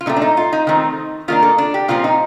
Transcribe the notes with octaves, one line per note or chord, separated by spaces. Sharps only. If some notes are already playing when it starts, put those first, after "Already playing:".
F4
A#2 F3 A3 C4 D#4
D4
D#4
F4
D#4
D#3 A3 C4
D#3 A#3 D4 F4
A4
D4
G4
A#2 F3 C4 F4
D#4